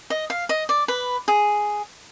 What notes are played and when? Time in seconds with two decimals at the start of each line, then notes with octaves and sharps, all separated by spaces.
0.10 D#5
0.30 F5
0.49 D#5
0.69 D5
0.88 B4
1.28 G#4